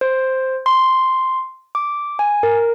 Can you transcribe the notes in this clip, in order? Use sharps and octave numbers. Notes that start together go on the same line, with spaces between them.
C5
C6
D6
G#5
A#4